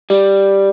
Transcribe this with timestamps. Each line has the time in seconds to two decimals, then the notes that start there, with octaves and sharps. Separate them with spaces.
0.10 G3